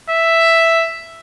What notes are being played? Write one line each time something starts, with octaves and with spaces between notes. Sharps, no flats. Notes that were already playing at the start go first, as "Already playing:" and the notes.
E5